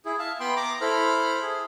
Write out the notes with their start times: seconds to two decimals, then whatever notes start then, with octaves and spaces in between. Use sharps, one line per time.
0.06 E4 G#4
0.19 E5 F5 A5
0.40 B3 G5 B5 C6
0.56 A#5 D6
0.81 E4 A4 C5 B5 F6
1.42 G#4